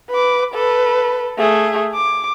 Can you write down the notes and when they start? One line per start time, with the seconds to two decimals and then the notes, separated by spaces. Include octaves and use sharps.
0.11 B4 D6
0.54 A4 B4
1.38 A3 G#4
1.95 D6